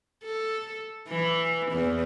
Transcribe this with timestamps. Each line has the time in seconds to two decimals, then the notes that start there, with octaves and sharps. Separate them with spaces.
0.24 A4
1.08 E3
1.72 E2